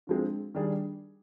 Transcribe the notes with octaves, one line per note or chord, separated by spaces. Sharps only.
D3 F3 G#3 C4
D#3 G3 D4 G#4